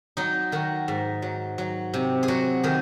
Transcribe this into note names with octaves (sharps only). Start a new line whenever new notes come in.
F#3 D#4
D#3 F#4
G#2
F#3
F#3
C3
G#4
F#3 F#4
D#3 G#4